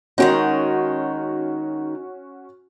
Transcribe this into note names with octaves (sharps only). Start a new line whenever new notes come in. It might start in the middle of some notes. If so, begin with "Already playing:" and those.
D#3 G#3 C#4 D#4 F#4